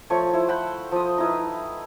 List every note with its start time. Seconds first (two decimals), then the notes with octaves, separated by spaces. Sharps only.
0.10 F3 A3 C#5 C#6
0.33 E4 C5
0.48 C5 F#5 G5 B5
0.92 F3 D#6
1.18 D#4 E4 B4